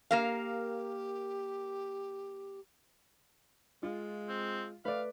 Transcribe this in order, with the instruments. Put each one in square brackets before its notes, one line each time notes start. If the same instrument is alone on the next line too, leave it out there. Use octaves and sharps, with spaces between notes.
[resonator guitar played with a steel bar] A#3 A#4 F5 [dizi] G4
[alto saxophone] G#3 [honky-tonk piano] F4
[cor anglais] C4
[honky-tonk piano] A3 [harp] B4 D5 [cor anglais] F5